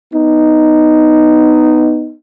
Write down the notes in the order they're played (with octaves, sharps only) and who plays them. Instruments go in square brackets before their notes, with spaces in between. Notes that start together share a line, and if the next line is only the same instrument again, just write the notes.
[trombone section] B3 D#4